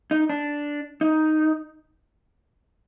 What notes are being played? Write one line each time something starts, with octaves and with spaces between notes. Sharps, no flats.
D#4
D4
D#4